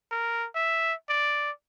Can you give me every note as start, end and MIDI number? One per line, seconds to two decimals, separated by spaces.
0.11 0.46 70
0.55 0.93 76
1.10 1.51 74